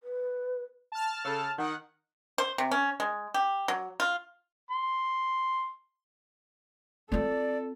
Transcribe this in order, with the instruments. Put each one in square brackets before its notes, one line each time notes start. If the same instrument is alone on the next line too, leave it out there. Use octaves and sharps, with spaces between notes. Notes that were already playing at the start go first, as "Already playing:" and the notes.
[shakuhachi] B4
[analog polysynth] A5 F6
[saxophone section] C#3 A4
[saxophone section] D#3 [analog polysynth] F#5
[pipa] C5
C3
C#4
G#3
G4
F#3
F4
[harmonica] C6
[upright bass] C4 F4 [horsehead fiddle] A4 [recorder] D5